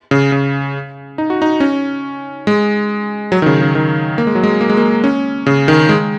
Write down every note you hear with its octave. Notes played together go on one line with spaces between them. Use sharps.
C#3
C#3
D#4
F#4
D#4
C#4
G#3
F#3
D#3
C#3
C#3
D#3
A#3
G#3
F#3
G#3
A#3
G#3
A#3
C#4
C#3
D#3
G#3